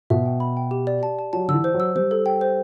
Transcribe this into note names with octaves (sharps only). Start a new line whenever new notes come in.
B2 E5
G5
B5
G5
G4
D5
A5
A5
F#3 A5
D3 E6
E3
C5
F#3
E6
G3 C5
A4
G5
C5